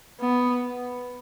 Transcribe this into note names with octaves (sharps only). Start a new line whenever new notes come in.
B3